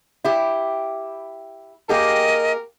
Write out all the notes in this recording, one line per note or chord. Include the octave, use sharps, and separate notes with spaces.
E4 G4
A#3 G4 G#4 A#4 D#5